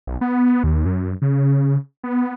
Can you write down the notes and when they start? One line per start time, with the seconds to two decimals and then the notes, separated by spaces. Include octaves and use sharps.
0.07 B1
0.21 B3
0.64 D#2
0.85 F#2
1.22 C#3
2.04 B3